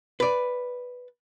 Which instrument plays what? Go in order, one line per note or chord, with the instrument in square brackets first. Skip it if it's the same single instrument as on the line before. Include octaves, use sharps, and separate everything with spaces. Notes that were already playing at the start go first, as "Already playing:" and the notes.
[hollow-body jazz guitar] B4 D5